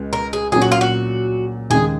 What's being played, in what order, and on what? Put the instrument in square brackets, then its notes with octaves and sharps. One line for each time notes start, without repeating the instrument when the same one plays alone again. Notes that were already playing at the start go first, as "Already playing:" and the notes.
Already playing: [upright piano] C#2 G#3
[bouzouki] A#4
G#4
[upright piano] A#2 F#3 C#4 [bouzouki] G#4
[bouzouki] F#4
F4
F#4
[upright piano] D#2 C#3 G#3 [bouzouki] G#4